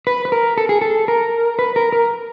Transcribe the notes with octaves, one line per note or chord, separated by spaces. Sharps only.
B4
B4
A#4
A4
G#4
A4
A#4
B4
A#4
A#4